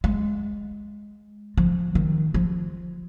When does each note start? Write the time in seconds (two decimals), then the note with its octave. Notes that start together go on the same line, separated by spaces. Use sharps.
0.04 G#3
1.57 F3
1.95 D#3
2.34 F3